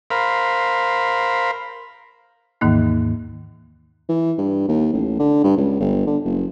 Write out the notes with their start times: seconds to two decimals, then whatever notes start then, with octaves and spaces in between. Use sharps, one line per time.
0.11 A#4 C5 F5 B5
2.61 D#2 G#2 D#3 E3 A#3 D#4
4.09 E3
4.38 G2
4.68 D#2
4.93 A1
5.19 D3
5.44 G2
5.57 C#2
5.80 G1
6.07 D3
6.25 F#1